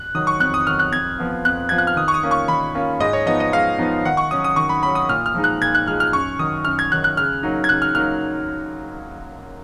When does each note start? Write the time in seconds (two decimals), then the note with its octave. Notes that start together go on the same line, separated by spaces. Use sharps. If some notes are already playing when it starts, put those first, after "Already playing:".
Already playing: F#6
0.15 D#3 F#3 D#6
0.27 C#6
0.40 F2 F#6
0.54 D#6
0.67 D#3 F#3 F6
0.79 F#6
0.92 F2 G#6
1.18 F3 B3 F4
1.45 F2 F#6
1.69 F3 B3 F4 G#6
1.78 F#6
1.87 F6
1.96 D#3 D#6
2.08 C#6
2.14 D#6
2.23 A#3 C#4 F4
2.31 C#6
2.48 D#3 B5
2.75 A#3 C#4 F4
3.00 G#2 D#5
3.13 C#5
3.26 F3 B3 D#4 D#5
3.40 D#5
3.52 G#2 F5
3.78 F3 B3 D#4
4.05 D#3 F#5
4.17 C#6
4.31 F#3 C#4 D#6
4.44 D#6
4.56 D#3 C#6
4.69 B5
4.83 F#3 C#4 B5
4.95 D#6
5.09 A#2 F6
5.26 F6
5.34 F3 G#3 D#4
5.44 F#6
5.61 A#2 G#6
5.75 F#6
5.86 F3 G#3 D#4 F6
6.00 F6
6.13 F#2 C#6
6.39 D#3 F#3 D#6
6.65 F#2 F6
6.79 G#6
6.91 D#3 F#3 F#6
7.04 F#6
7.17 C#3 F6
7.43 F#3 A#3 D#4
7.64 G#6
7.69 C#3 F#6
7.82 F6
7.95 F#3 A#3 D#4 F6